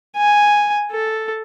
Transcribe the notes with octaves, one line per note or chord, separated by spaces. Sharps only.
G#5
A4